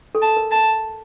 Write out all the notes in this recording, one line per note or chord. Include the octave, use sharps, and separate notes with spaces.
A4
A5
A#4
A5